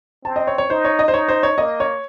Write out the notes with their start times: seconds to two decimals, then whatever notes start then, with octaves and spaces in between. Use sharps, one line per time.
0.25 C4 A5
0.36 D#5
0.47 C#5
0.58 C#5
0.69 D#4 C5
0.85 C#5
0.99 D#5
1.08 C5
1.14 D#4 C#5
1.28 C5
1.43 C#5
1.57 A#3 D#5
1.80 C#5